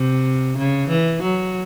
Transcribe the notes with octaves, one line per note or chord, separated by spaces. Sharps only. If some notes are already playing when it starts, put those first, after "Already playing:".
Already playing: C3
C#3
E3
F#3